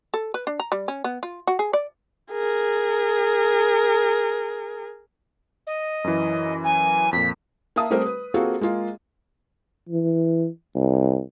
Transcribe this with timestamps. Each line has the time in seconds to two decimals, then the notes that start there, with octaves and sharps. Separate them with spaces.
0.14 A4
0.34 B4
0.47 D4
0.60 A#5
0.72 G3
0.88 C#4
1.04 B3
1.23 F4
1.47 F#4
1.59 G#4
1.73 D5
2.32 G#4 A#4
5.67 D#5
6.04 F#2 E3
6.63 G#5
7.13 F2 A#2 B6
7.76 A#3 E5 F5 A5 D#6
7.90 G3 A3 C4 G4 A#4 C5
8.06 B4
8.34 A#3 C4 F4 F#4 G#4 A4
8.61 G#3 A#3 F4 G#4
9.89 E3
10.75 C2